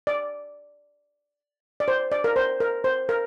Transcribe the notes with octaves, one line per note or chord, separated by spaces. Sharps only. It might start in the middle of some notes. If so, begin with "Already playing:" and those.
D5
D5
C5
D5
A#4
C5
A#4
C5
A#4